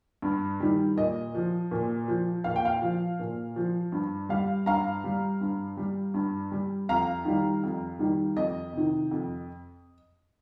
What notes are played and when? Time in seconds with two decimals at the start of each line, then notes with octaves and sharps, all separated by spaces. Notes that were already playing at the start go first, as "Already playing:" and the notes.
0.22 G2
0.60 D#3 G3
0.96 A#2 D#5
1.35 F3
1.71 A#2
2.08 F3
2.44 A#2 F5
2.56 G5
2.65 F5
2.82 F3
3.19 A#2
3.56 F3
3.92 G2
4.29 G3 F5
4.66 G2 F5 A#5
5.04 G3
5.41 G2
5.77 G3
6.14 G2
6.52 G3
6.89 F2 F5 A#5
7.25 D#3 G3
7.63 F2
7.99 D#3 G3
8.36 F2 D#5
8.73 C3 D#3
9.11 F2